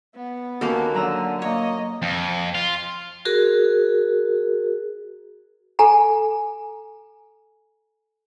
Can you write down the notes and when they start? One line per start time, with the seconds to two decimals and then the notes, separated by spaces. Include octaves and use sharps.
0.16 B3
0.61 D#2 A#3 C#4 F#4 A4
0.94 D3 F#3 A#5 E6
1.42 A#3 C#5 D#5
2.02 F2
2.55 F4
3.25 F#4 G#4 A#4
5.79 A4 G#5 A#5